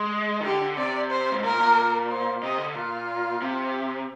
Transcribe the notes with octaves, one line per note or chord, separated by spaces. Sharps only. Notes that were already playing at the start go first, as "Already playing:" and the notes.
Already playing: G#3
D#3
D3 G4
D3
C3 D5
C5
G#2
A#2 A#4
A#2
C5
C3 D#5
D3
A#2 F4
C3